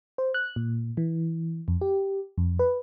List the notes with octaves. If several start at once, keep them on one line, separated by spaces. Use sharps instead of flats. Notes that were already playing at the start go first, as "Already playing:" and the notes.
C5
F#6
A#2
E3
F2
G4
F2
B4